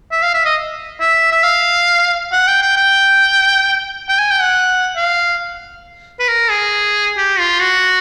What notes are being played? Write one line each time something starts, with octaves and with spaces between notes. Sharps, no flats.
E5
F5
E5
D#5
E5
E5
F5
F#5
G5
G5
G5
G5
G#5
G5
F#5
F5
B4
A#4
G#4
G4
F4
F#4